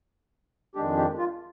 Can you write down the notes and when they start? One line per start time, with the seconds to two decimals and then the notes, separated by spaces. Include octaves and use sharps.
0.75 F2 D#3 G#3 D4 G4
0.97 G4
1.18 F4